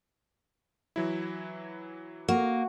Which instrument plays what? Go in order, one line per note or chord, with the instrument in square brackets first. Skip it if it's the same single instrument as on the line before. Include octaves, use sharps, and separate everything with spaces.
[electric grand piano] E3 F#3 E4
[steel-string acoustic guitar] A#3 [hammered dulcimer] F#4